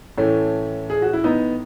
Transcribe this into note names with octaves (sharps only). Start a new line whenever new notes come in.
A2 E3 A3 C#4
G#4
F#4
E4
B3 D#4